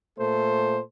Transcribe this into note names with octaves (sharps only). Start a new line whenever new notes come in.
A#2 A3 A4 C5